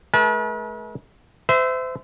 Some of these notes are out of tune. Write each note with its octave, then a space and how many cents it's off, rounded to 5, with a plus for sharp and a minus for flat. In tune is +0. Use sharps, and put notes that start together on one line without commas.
A3 -40 B4 -45 A5 -30
C5 -35 E5 +0